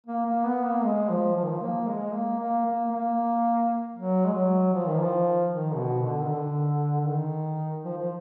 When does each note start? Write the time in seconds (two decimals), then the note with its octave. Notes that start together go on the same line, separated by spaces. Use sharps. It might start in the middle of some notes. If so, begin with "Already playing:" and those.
0.07 A#3
0.25 A#3
0.45 B3
0.65 A#3
0.84 G#3
1.09 F3
1.36 F3
1.44 D#3
1.52 F3
1.62 A#3
1.88 G#3
2.13 A#3
2.40 A#3
2.66 A#3
2.92 A#3
3.96 F#3
4.25 G#3
4.34 F#3
4.73 F3
4.87 D#3
5.00 F3
5.51 D#3
5.76 B2
6.02 D3
6.22 D#3
6.28 D3
7.01 D3
7.07 D#3
7.85 F3
7.98 F3